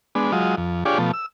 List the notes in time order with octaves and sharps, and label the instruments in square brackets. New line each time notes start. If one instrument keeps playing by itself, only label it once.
[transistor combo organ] G#3 B3 D4
F#3 G#3 F4 D#5
F2
D4 F4 G4 G#4 C#5 D5
B2 F3 A3
E6